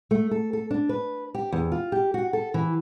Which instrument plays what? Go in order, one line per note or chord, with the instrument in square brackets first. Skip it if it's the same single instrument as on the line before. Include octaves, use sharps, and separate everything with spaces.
[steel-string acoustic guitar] A3
A4
A4
D4
B4
G4
E2
F4
G4
F#4
A4
E3